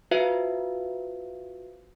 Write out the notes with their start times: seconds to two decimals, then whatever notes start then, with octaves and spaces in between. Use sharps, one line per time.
0.11 F4 F#4 B4 C5 E5 F5